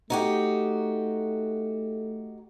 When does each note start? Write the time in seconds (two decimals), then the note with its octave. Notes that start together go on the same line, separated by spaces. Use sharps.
0.10 A3 D#4 F#4 G4